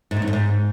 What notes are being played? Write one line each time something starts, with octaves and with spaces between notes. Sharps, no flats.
G#2
B2
E2
F2
G#2